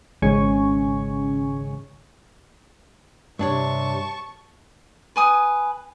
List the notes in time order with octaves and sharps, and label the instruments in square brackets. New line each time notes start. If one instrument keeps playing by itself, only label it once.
[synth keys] G#1 C#3 G#3 C#4 G#5 C#6
[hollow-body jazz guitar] G2 D4 C#5 [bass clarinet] C3 [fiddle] A5 C#6
[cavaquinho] B4 G#5 D#6